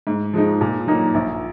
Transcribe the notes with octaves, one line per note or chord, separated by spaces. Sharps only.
G#2
F3 G#3 D#4
A#2
F#3 A#3 D#4
A#1